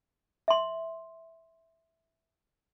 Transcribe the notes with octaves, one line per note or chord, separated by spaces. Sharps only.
E5 C6